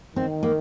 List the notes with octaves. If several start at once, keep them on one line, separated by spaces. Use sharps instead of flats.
D#3 C4
A#3